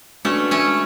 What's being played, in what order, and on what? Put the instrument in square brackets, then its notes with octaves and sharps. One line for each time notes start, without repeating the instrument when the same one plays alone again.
[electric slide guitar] G#3 D4 F#4 B4 [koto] A3 C#4
[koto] A3 C#4